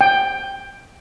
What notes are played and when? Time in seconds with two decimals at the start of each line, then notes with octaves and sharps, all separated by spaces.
0.01 G5